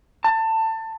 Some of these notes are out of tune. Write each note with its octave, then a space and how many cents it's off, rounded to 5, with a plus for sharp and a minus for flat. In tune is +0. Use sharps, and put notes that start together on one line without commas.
A5 +25